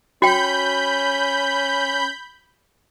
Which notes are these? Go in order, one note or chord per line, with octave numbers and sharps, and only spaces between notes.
C#4 F#4 G5 B5 G6